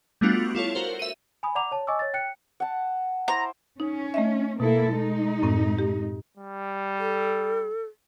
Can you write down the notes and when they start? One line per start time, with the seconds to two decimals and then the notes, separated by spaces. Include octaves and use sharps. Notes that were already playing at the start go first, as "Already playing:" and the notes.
0.21 G3 A3 B3 D4 F4 F#4
0.55 E4 F4 A4 C#5
0.75 F#4 A#4 C5
0.99 E5 D#7
1.43 G#5 B5 D#6
1.55 D5 F#5 A#5 D6 F7
1.71 C#5 A5
1.87 D#5 G#5 C#6 D6 E6
1.99 C#5 A6
2.14 G5 F#6 C#7
2.60 F#5 A5
3.28 E4 C5 A#5 D6
3.80 C#4 D#4
4.14 A3 D#5 E5
4.60 B2 A#3 E4 A4
4.94 G#3 D#4
5.42 F#2 A2 C4
5.79 G4
6.37 G3
6.99 A4